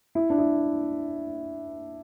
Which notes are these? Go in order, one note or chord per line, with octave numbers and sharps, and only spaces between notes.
E4
D4
E4